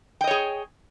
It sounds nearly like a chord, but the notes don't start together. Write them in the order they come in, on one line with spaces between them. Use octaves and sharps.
G5 D#5 C#5 G#4